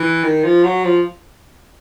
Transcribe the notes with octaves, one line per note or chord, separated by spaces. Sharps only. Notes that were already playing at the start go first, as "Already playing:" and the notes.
Already playing: E3
D#3
F3
F#3
F3